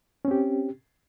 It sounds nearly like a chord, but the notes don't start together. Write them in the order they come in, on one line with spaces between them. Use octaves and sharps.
C#4 C4 G4